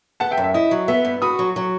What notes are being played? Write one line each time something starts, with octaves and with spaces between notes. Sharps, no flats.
B3 F#5 A5
E5 G5
F#2
E5
E4 D#5
F#3
B3 E5
G2
F#4 B5 D#6
F#3
F#3